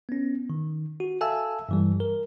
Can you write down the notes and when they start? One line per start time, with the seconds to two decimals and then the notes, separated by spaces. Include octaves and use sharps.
0.09 B3 C#4
0.50 D#3
1.00 F#4
1.21 A4 E5 F5 G#5 A5 E6
1.69 G2 E3 G3
2.00 A#4